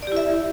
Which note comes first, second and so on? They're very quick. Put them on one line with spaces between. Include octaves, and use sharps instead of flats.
D5 G4 E4 E5